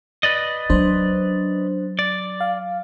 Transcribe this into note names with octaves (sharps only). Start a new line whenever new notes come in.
B4 D5 D#5
F#3 C#4 D4 C5
D5
F5